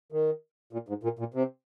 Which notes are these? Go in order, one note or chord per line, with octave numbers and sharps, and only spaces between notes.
D#3
A#2
G#2
A#2
A#2
C3